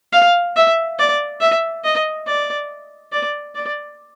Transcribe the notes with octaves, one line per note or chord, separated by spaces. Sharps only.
F5
E5
D5
E5
D#5
D5
D5
D5